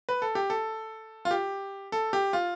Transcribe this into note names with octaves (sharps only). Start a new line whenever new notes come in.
B4
A4
G4
A4
F4
G4
A4
G4
F4